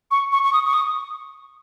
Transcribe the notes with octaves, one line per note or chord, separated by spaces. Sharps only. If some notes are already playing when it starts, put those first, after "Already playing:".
C#6
C#6
C#6
D#6
C#6
D#6